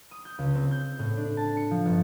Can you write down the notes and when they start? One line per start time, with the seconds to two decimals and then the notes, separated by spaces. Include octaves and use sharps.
0.11 D#6
0.25 G6
0.38 C#2
0.55 C4
0.71 G6
0.99 A2
1.17 D4
1.37 A5
1.57 C#7
1.71 F3
1.85 G1